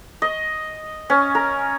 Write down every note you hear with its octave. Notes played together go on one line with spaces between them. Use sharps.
D#5
C#4
A#4